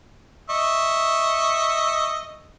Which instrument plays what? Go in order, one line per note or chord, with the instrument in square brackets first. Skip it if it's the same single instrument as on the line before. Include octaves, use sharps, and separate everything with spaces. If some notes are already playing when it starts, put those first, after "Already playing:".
[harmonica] D#5 E5 C#6